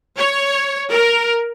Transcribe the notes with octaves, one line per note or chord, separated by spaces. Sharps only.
C#5
A#4